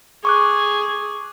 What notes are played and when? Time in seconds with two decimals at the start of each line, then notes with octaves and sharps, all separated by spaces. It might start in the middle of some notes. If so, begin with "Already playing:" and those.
0.25 G#4 C#6 D6 F#6